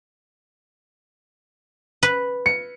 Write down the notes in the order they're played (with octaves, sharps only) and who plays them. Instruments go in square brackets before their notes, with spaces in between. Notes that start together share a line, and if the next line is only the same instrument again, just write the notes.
[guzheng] B4
[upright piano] C#7